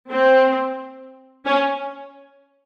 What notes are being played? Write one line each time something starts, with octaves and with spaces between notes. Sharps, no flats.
C4
C#4